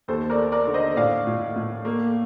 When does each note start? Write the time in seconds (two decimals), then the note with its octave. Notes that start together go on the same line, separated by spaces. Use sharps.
0.08 D#2 A4 C5
0.30 A#4 D5
0.37 A3
0.52 A#4 D5
0.67 D3
0.74 C5 D#5
0.96 A2 D5 F5
1.27 A2
1.56 A2
1.85 A#3